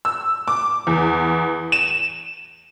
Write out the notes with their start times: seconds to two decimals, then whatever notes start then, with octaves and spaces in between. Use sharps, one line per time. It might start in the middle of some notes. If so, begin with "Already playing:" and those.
0.05 E6
0.48 D6
0.87 E2
1.72 E7